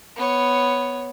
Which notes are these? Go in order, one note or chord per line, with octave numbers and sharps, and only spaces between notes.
B3 C#5